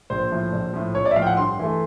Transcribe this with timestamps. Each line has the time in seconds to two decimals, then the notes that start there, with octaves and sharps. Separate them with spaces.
0.10 A#1 C5
0.31 A2 F3
0.53 A#1
0.73 A2 F3
0.94 A#1 C#5
1.06 D5
1.11 E5
1.16 A2 F3 F5
1.22 G5
1.26 F#5
1.37 G2 C6
1.59 E3 A3